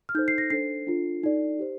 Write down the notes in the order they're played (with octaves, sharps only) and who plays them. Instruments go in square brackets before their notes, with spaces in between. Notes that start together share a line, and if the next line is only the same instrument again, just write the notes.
[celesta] F6
D#4 A4 C5 G6
C7
A#6
D4 A4 C5 C7
D4 F4 A4
D#4 A4 D5
G4 C5